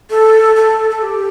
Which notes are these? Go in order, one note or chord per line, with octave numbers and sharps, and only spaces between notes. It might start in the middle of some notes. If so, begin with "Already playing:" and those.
A4
A4
A4
G4